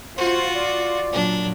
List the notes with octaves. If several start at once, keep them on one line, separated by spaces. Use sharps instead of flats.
F4 F#4 C5
D5
A#2 F#3 D4